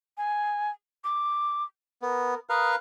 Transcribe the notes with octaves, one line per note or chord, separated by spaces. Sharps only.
G#5
D6
B3 A#4
A#4 B4 F5 D#6